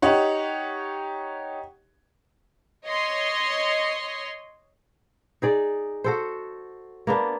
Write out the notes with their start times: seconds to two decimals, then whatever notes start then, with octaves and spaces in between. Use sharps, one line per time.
0.02 D#4 G4 C#5 F#5
2.85 C#5 D#5 C6
5.42 D#4 G#4 D5
6.04 F#4 A4 C5
7.07 A#3 B3 D4